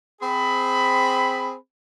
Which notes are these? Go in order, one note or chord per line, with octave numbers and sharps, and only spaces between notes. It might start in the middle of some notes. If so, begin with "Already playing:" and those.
C4 G#4 B5